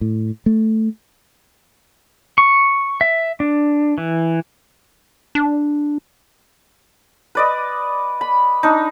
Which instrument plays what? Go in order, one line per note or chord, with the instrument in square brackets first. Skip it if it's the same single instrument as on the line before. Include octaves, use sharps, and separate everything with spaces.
[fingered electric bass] A2
A3
[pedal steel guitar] C#6
E5
D4
E3
[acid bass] D4
[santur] B4 D5 D#5
B5
D4 D#4